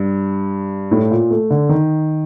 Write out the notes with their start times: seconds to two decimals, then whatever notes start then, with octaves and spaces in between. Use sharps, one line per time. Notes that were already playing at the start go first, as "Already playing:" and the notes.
Already playing: G2
0.91 A2
1.11 A#2
1.31 A3
1.50 D3
1.69 D#3